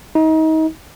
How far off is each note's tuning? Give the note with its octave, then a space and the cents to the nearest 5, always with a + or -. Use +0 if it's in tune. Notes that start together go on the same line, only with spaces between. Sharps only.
D#4 +30